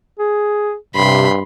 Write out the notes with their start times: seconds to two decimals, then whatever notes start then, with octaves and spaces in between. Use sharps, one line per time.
0.19 G#4
0.95 G2 C3 B5 C6